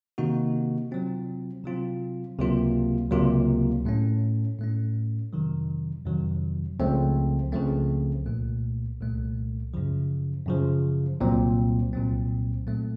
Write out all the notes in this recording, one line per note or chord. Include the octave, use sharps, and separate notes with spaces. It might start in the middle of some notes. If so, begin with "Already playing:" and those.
C3 D#3 A#3 D#4 F#4
C3 F#3 C4 F4
C3 F#3 C4 F4
C#2 C3 F#3 A#3 F4
C#2 C3 F#3 A#3 F4
A2 A3 C#4
A2 A3 C#4
F2 C3 D#3 F#3
F2 C3 D#3 F#3
C#2 C#3 F3 A3 C4
C#2 C#3 F3 A3 C4
C2 A#2 A3
C2 A#2 A3
F#2 C#3 F3
F#2 C#3 F3
C2 A#2 F#3 C4
C2 A#2 F#3 C4
A#2 F#3 A3 C4